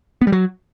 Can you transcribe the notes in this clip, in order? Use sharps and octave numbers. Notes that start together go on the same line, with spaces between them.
B3
G3
F#3